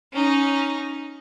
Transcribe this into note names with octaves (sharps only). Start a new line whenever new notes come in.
C#4 D#4